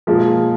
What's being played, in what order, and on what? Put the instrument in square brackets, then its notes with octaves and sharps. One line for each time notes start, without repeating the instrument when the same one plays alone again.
[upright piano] B1 B2 A#3 [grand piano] F3 G#3